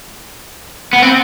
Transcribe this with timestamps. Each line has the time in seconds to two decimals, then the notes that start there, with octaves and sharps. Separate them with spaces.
0.93 B3
1.02 C4